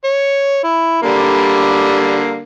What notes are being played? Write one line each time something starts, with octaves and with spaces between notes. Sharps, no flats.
C#5
E4
D3 G3 A#3